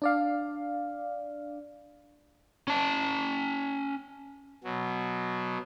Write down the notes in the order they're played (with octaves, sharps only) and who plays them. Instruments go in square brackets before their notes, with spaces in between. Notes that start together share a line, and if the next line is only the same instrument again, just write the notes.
[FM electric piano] D4 D5 F5
[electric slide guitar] C#4 A5
[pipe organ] B2 F#3